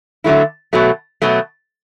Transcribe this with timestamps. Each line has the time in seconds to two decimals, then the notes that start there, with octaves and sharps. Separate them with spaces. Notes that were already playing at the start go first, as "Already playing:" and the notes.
0.24 D3 F#3 A3 E4
0.73 B2 F#3 A3
1.22 B2 F#3 A3